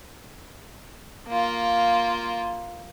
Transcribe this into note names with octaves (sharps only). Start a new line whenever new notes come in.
A#3 F4